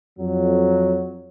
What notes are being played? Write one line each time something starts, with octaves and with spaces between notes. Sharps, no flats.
F2 F#3